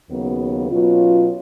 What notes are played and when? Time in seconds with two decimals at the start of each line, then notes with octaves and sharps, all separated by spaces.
0.09 D#2 C#3 F#3 B3
0.69 B2 F#3 C#4 F4